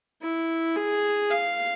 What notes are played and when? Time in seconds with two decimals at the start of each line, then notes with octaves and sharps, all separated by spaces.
0.22 E4
0.76 G#4
1.30 F5